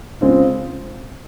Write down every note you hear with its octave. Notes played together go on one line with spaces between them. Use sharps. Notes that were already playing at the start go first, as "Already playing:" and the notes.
C#3 G#3 C4 F4